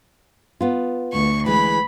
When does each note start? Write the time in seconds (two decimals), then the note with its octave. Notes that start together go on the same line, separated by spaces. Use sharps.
0.61 B3 F4
1.12 D2 C#6
1.46 E3 G#3 B5